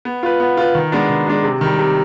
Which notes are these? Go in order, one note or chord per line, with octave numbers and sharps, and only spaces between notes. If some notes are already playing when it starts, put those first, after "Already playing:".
B3
F4 B4
B3
F4 B4
D#3
G#3 B3 D4
D#3
G#3 B3 D4
C3
D#3 G3
C3